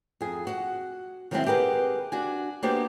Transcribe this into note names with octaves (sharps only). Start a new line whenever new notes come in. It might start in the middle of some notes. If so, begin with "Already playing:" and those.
F2 G#4
F#4 F#5
D#3 F#3 G#3 A#3 C4 E4
G4 G#4 A#4 B4 F#5
D4 F#4 G#5
A#3 B3 D4 F#4 G4 C5